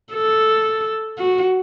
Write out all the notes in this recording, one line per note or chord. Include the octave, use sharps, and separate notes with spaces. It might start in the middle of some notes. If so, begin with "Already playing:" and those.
A4
F#4